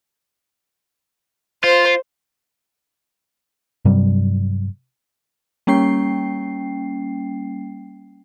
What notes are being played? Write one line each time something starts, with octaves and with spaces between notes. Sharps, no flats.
F4 C5
G2 C3 F#3 G3
G3 A#3 C#4 G5 C7